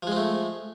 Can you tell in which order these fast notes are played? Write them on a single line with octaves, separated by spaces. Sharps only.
F3 G#3 C4 A3